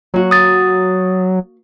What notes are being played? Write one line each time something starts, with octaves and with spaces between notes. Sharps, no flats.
F#3 A#3 F#4
D#6 A6